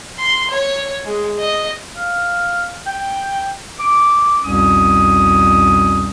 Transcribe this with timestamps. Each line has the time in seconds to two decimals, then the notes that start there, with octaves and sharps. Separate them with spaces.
0.19 C6
0.51 C#5
1.06 G#3
1.39 D#5
1.97 F5
2.87 G5
3.80 D6
4.44 C2 F2 B2 C#4 D#6